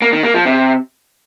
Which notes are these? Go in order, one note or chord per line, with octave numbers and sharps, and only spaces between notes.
A#3
D#3
A#3
F3
C3